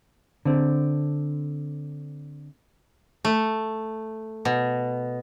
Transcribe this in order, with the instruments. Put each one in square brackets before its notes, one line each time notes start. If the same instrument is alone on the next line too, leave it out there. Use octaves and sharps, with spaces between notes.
[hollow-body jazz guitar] D3 C4
[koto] A3
B2